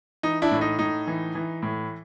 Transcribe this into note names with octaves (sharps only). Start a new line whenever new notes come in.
E3 D#4
D4 E4
A2
D#4
A2 D#4
E3
E3
A2